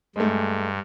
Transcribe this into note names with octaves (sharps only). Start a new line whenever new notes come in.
G2 G#3 A3